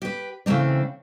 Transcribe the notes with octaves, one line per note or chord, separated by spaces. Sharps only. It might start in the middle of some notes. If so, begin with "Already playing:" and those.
G4 B4
C#3 E3 A3 C4 D4